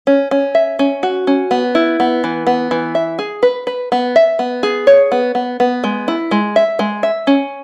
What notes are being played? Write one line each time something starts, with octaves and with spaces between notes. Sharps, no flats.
C#4
C#4
E5
C#4
F#4
C#4
B3
E4
B3
E3
B3
E3
E5
G#4
B4
B4
B3
E5
B3
G#4
C#5
B3
B3
B3
G#3
E4
G#3
E5
G#3
E5
C#4